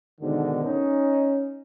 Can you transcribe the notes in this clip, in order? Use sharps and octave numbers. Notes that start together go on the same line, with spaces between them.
G#2 B2 D3 D#3
C#4 D#4